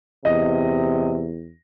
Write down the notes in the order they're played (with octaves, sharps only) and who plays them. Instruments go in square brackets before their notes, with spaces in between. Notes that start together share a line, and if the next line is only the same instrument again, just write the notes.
[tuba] E2 [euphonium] C3 [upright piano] D#5